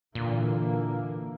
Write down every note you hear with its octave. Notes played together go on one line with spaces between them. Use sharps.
A#2 D3 E3 A#3